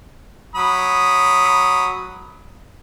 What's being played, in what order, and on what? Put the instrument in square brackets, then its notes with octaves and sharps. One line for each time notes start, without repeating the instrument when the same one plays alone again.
[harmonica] F#3 B5 D#6